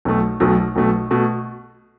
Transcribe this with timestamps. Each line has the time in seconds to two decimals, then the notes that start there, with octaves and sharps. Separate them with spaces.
0.05 B1 B2 A3
0.40 B1 B2 A3
0.76 B1 B2 A3
1.11 B2 A3